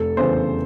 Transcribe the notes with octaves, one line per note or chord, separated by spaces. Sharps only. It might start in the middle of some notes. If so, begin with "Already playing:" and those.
Already playing: F1 A4
E2 C#3 E3 C5